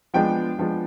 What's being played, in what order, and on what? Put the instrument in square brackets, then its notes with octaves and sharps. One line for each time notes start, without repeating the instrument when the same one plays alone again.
[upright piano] F3 G#3 B3 D4 [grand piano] G5
[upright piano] F3 G#3 B3 D4